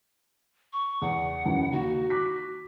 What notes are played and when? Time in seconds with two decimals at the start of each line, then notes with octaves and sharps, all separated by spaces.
0.73 C#6
1.02 E2 F#5
1.45 F#2 D#3 E3
1.72 D#2 D#3 F#4
2.10 D6 F#6 B6